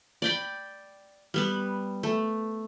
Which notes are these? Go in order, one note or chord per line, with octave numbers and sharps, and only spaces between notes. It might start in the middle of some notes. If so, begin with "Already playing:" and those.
D5 G5 B5
G3 B3 B4
A3